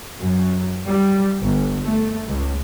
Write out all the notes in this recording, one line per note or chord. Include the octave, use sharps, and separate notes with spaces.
F#2
G3
G1
A3
C#2